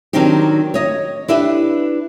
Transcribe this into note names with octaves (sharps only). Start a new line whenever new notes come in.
D#3 F#3 C4 D4 D#4 G4
C#5 D#5
D4 E4 G4 B4